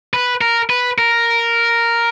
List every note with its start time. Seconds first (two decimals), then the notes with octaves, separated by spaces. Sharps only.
0.13 B4
0.41 A#4
0.70 B4
0.98 A#4